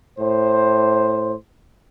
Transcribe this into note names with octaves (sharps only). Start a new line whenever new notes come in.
A2 C5